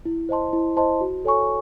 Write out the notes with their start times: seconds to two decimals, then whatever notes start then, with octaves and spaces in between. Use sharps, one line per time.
0.05 E4
0.29 C5 D#5 A5 C6
0.53 E4
0.77 C5 D#5 A5 C6
1.01 F#4
1.25 A4 C#5 G#5 C#6